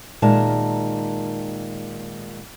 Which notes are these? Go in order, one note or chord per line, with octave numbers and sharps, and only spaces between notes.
A#2 D#3 G#3 A#4 E5 A5